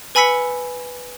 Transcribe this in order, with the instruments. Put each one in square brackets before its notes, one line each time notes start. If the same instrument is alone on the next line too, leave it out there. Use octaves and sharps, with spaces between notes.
[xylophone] B4 G#5 B5 E6 B6 C#7